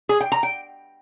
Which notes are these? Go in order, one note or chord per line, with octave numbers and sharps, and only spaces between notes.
G#4
G5
A#5
G5